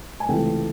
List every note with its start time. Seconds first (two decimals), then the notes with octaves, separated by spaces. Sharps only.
0.20 G#5
0.29 C#2 C3 E3 A3 G5